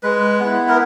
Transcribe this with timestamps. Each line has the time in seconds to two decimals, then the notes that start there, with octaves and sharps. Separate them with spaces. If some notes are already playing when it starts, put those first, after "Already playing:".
0.03 G#3 B4
0.40 B3 E4
0.69 A#4